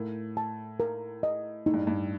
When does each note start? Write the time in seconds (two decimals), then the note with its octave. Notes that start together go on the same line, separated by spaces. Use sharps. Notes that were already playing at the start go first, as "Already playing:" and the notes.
Already playing: A2 A#4
0.37 A5
0.80 A#4
1.23 D#5
1.66 A2 D#4
1.74 G2
1.87 G2